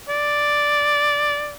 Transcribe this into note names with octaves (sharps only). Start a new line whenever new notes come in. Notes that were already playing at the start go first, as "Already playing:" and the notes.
D5